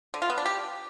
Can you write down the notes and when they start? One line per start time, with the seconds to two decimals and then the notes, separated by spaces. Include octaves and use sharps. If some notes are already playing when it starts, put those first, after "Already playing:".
0.14 D3
0.22 F4
0.30 B3
0.38 D4
0.46 G4